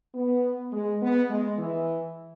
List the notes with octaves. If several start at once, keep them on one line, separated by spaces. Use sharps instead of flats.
B3
G#3
B3
G#3
E3